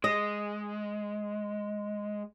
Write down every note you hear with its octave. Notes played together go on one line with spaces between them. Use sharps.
G#3 D#5